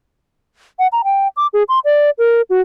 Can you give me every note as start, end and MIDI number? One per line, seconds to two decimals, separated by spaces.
0.79 0.87 78
0.92 1.02 82
1.04 1.28 79
1.37 1.47 86
1.53 1.63 68
1.69 1.79 84
1.85 2.10 74
2.19 2.42 70
2.50 2.61 66